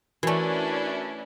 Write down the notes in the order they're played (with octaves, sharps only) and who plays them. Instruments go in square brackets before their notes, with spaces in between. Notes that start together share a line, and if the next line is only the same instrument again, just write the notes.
[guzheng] E3 A3 [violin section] C#4 D4 E4 [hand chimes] F#4 A#4